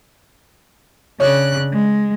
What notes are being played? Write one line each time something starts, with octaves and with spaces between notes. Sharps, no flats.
C#3 D4 D#4 C#5 F#6
G#3